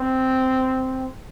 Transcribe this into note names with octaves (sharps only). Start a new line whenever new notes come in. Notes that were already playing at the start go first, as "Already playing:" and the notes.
Already playing: C4